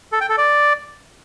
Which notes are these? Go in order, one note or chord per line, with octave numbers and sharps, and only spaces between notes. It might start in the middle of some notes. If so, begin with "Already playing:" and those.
A4
G5
A4
D5